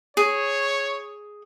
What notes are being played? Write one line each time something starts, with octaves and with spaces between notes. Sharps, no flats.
G#4 C#5